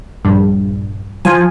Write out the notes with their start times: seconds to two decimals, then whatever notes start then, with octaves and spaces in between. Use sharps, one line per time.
0.25 A#1 G2
1.25 F3 G#5